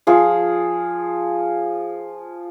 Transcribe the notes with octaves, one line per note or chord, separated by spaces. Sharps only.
F3 G#4